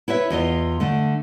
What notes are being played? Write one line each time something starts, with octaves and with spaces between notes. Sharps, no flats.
E4 B4 C#5 E5
E2 F4 D#5
D3 A3